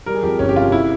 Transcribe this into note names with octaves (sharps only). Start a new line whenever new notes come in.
G3 A#4
G#4
F2 G4
G1 C#4
G4
C3 F4
E4